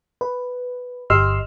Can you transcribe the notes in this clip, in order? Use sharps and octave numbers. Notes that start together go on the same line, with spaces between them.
B4
G1 G4 D#5 C6 E6 F6